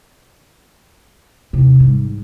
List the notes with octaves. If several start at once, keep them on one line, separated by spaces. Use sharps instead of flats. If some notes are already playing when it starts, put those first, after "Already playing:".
D#2 C3
G#2 G3